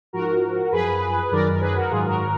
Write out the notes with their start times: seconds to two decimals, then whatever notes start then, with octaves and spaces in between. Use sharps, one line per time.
0.13 G#2 F3 F#4 A#4
0.72 F#2 F3 G#4 B4
1.31 F#2 D#3 F#3 A#4 D5
1.53 A#4
1.61 G#4 B4
1.76 F#4 A#4
1.90 G#2 D#3 F#3 F4 G#4
2.05 F#4 A#4